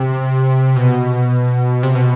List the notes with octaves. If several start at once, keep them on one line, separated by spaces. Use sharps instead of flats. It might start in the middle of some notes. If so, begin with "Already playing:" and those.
Already playing: C3
B2
C3
B2